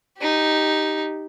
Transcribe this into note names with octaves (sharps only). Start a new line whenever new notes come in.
D#4 G4